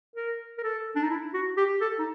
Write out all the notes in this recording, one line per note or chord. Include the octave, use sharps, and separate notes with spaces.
A#4
A#4
A4
D4
D#4
E4
F#4
G4
A4
D#4